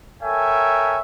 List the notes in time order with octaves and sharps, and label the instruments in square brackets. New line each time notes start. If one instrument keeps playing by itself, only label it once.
[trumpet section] A4 A#4 C#5 E5 G5 G#5